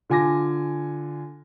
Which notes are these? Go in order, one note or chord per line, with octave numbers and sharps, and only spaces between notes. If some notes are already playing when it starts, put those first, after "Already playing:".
D3 F4 G#5 D6 A#6